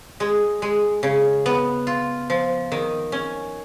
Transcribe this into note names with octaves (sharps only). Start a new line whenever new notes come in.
G#3
G#3
C#3
B3
F4
F3
D#3
C#4